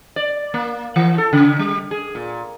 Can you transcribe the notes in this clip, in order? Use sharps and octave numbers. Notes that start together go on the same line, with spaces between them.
D5
A#3
E3
A4
C#3
G3
G#4
A#2